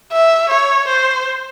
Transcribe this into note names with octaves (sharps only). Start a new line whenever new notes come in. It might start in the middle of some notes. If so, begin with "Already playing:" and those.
E5
C#5
C5